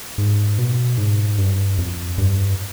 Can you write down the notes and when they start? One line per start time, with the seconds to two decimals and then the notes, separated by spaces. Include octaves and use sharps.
0.18 G#2
0.59 B2
0.98 G#2
1.38 G2
1.78 F2
2.18 G2